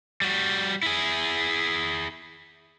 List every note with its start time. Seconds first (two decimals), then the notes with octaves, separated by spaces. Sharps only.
0.22 G3 F#4
0.83 E4 G#4